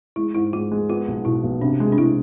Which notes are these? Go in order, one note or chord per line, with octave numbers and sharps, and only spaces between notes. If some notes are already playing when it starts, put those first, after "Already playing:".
G#3 E4
G#2 E4
G#3 F4
G#3
B3 F4
B1
B2 E4
B1
C3 D4
G#3
D4
G#3 E4